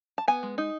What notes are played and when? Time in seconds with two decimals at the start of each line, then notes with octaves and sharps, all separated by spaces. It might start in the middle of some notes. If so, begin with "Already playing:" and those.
0.18 A5
0.28 B3 G#5
0.43 G#3
0.58 D#4